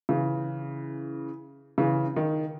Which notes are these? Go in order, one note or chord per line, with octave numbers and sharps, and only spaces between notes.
C#3 E3
C#3 E3
D#3